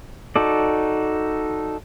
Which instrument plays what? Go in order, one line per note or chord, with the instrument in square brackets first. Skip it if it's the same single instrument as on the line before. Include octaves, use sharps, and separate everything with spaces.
[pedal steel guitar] D#4 F#4 A4 D5